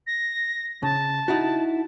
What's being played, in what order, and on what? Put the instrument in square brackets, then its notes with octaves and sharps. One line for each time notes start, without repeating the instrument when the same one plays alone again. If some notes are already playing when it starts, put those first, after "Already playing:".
[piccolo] A#6
[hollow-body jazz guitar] C#3 [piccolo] A5
[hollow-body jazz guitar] D#4 E4 F#4